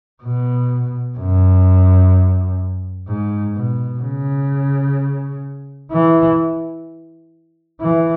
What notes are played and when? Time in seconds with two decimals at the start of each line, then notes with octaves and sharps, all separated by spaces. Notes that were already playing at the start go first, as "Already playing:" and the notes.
0.23 B2
1.18 F#2
3.07 G#2
3.55 B2
4.02 C#3
5.92 E3
7.81 E3